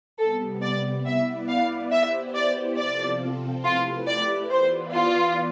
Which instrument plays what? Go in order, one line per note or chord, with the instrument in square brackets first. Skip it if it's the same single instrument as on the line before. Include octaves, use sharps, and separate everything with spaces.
[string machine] C3 G3 B3 [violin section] A4
[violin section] D5
[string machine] B3 E4 B4 D5 [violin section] E5
[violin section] F5
[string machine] B3 E4 G4 C5 [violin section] E5
[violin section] D5
[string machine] C3 F3 C4 F4 A4 [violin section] D5
[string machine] A3 E4 G4 B4 [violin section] F4
[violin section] D5
[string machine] E3 B3 F4 B4 D5 [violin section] C5
[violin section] F4